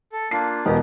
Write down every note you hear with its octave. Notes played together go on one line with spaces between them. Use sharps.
A4
A#3 D4 F4 C7
E1 B2 B3 G4 G#4 A#4